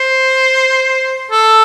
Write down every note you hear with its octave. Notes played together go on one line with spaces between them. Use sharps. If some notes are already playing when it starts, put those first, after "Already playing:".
Already playing: C5
A4